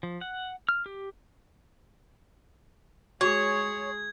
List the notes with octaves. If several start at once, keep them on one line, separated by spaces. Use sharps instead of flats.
F3
F#5
F6
G4
G#3 F#4 G#4 C#5 G#6